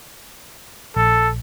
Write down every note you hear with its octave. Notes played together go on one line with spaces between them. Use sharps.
A#1 A4